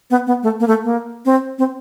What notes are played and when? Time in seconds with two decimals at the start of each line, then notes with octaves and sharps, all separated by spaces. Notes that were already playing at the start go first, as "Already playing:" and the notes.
0.10 B3
0.27 B3
0.43 A3
0.60 A#3
0.68 A3
0.84 A#3
1.25 C4
1.58 C4